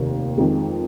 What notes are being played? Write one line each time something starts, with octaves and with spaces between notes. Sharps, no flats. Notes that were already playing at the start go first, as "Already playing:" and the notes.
Already playing: F1 D#2 D#3
F2 D#3 G#3